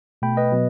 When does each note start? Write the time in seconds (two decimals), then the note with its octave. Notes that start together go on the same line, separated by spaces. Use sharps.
0.22 B2 A3 G5 B5
0.37 B4 D#5
0.52 B2 F#3 B3